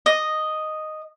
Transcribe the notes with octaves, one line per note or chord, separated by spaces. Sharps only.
D#5